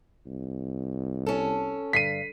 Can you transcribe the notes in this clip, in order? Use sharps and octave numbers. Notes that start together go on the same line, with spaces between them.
C2
C#4 A4
G2 D3 B6 C7 D#7